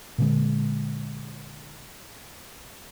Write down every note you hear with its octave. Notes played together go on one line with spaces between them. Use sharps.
A#2 D3 G#3